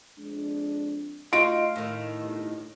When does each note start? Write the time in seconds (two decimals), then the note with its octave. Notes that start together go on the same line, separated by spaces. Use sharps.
0.18 F2 G#3 D4
1.33 A3 D#4 F4 F#4 F5 D7
1.76 A2 D#3
2.19 G1